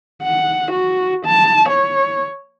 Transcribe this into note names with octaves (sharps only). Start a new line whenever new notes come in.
F#5
F#4
A5
C#5